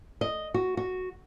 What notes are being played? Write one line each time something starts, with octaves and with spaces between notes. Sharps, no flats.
D#5
F#4
F#4